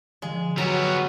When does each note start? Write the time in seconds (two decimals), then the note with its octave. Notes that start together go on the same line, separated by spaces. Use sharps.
0.22 D3 F3 G#3
0.58 F#3 G3 B3 A#5